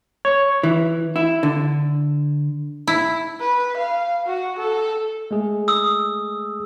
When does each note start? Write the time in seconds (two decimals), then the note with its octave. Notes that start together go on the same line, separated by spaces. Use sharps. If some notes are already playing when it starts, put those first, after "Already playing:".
0.25 C#5
0.63 E3
1.16 E4
1.43 D3
2.87 E4
3.40 B4
3.77 F5
4.26 F#4
4.58 A4
5.31 G#3 A3 G#4
5.68 D#6 E6